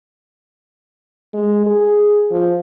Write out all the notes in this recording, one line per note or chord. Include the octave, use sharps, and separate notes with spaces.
G#3
G#4
F3